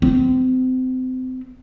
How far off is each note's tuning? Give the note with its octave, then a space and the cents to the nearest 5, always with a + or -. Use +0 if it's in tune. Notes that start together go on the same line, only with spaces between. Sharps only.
C4 -30